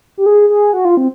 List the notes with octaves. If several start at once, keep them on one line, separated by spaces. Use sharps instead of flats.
G4
G#4
G#4
F#4
F4
C4